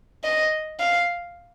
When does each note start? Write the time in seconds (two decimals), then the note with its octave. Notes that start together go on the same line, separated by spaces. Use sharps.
0.24 D#5
0.79 F5